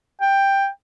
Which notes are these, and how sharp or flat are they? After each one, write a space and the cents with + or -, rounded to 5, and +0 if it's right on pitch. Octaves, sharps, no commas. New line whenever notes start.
G5 +10